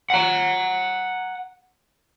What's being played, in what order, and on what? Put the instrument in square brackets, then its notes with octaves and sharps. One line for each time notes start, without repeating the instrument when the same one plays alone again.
[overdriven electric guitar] F#5 A#5